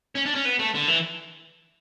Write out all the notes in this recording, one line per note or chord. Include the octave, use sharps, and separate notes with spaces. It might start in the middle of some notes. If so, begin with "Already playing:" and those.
C#4
D4
C#4
B3
A3
D3
E3